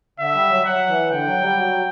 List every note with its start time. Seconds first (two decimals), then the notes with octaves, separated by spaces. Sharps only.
0.19 D3 E5
0.35 G3
0.50 F#3
0.65 F#3 F#5
0.89 E3
1.11 D3 G5
1.27 F#3
1.42 G3
1.58 F#3